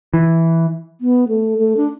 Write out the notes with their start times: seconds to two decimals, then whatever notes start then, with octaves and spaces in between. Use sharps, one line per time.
0.14 E3
1.01 B3
1.29 A3
1.58 A3
1.77 D4